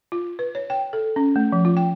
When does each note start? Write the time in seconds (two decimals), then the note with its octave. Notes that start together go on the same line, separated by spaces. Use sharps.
0.12 F4
0.39 B4
0.55 C#5
0.70 G5
0.93 A4
1.16 C#4
1.36 A3
1.52 F3
1.65 F4
1.77 G5